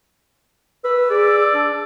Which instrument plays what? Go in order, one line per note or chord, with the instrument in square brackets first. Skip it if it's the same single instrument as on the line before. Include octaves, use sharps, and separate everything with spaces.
[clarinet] B4 [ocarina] E6
[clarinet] G#4 [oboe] D5
[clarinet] D4